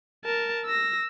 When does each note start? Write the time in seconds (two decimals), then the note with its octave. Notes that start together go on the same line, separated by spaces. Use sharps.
0.25 A#4 A5
0.66 E6 A#6